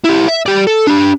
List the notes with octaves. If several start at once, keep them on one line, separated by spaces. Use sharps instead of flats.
E4 G4
E5
G4 D5
A4
D4 G4